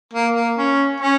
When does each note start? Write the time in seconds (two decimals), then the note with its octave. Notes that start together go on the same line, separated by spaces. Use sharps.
0.13 A#3
0.34 A#3
0.57 C#4
1.00 C#4